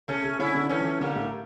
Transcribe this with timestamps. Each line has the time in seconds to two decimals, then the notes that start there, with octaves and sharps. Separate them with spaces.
0.08 C#3 A3 C#4
0.24 C#3
0.39 D3 C#4 E4
0.55 D3
0.69 E3 A3 C#4
0.80 F3
0.85 E3
1.01 D3 G3 A#3
1.15 A2